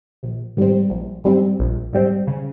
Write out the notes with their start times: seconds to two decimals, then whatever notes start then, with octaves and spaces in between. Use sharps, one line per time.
0.23 A#1
0.57 G#2 G3 C4
0.90 A#1
1.24 G#2 G3 C4
1.59 A#1
1.93 G#2 G3 C4
2.27 C#3